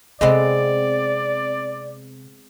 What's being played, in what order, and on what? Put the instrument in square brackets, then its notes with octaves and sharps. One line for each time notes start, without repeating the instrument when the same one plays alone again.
[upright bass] C3 [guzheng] G#3 B3 C4 [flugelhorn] D5 [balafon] D#5